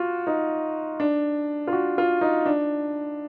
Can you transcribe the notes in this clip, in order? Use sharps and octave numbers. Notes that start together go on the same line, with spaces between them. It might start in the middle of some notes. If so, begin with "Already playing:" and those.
Already playing: F4 F#4
D#4
D4
F4
F#4
F4
D#4
D4